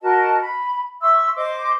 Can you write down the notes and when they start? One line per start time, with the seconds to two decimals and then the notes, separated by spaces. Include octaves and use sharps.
0.01 F#4 A#4 D#5 A5
0.40 B5
1.01 E5 C6 C#6 E6
1.35 C5 D#5 C6 D6